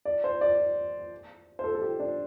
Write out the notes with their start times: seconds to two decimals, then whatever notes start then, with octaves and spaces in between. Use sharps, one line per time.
0.05 D5
0.24 C5
0.41 D5
1.59 C5
1.64 A4
1.75 A4
1.82 G4
2.00 D4